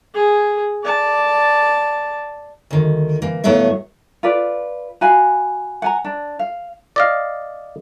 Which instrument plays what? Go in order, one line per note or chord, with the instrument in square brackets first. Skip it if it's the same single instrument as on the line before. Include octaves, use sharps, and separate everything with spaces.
[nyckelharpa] G#4
D5 A5
[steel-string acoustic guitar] D2 D#3
E3 A#3
A2 F#3 A3 B3 E5 F5
[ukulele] F4 B4 D5
F#4 F5 G#5 B5
F#5 G#5 A#5
D4
F5
[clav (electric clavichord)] D5 D#5 F5